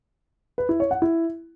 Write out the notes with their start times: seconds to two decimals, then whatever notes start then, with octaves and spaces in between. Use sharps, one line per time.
0.58 B4
0.69 E4
0.80 C#5
0.91 F#5
1.02 E4